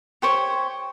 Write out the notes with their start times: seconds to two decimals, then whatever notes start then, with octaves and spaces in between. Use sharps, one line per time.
0.22 G4 C5 C#5